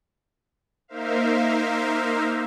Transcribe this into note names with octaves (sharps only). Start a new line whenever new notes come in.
A#3 D#4 A#4 C5 E5 F5